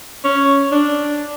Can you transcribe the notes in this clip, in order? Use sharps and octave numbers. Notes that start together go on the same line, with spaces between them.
C#4
D4